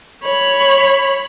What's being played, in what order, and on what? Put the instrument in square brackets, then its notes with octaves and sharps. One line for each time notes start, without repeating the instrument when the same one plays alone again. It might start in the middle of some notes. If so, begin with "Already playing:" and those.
[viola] C#5 B5